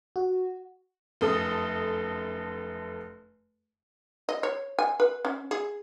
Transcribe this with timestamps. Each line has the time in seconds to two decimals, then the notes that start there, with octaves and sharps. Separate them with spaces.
0.16 F#4
1.21 F1 F#2 A4 D#6
4.29 D#5
4.43 C#5
4.79 G#5
5.00 B4
5.25 C#4
5.51 G#4